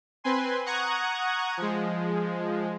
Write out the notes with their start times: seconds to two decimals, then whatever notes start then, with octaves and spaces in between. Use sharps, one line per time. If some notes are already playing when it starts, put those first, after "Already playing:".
0.24 C4 B4 G#5 C6
0.66 F#5 A#5 C#6 D#6 F#6 G#6
1.57 F3 G#3